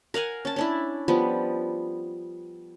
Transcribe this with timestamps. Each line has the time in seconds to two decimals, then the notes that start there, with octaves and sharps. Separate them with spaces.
0.14 A#4 F5 F#5 G#5
0.45 C#4 A5
0.56 C#4 D4 E4
1.08 F3 G3 B3